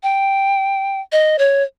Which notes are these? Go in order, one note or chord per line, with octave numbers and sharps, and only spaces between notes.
G5
D#5
C#5